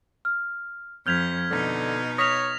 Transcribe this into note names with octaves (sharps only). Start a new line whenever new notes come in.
F6
F2 F6 G6 G#6 B6 F7
B2 D3 D#4
C#5 D#6 F6 A#6 B6 F7